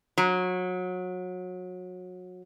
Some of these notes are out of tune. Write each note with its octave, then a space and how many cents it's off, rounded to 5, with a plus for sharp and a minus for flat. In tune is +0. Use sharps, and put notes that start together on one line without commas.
F#3 -25 A#5 +0